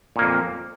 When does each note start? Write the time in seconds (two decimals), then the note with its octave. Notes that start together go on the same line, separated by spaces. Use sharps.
0.16 A#2
0.19 A#3
0.22 F2